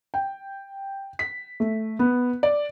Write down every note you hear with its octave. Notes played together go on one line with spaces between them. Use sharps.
G5
B6
A3
B3
D5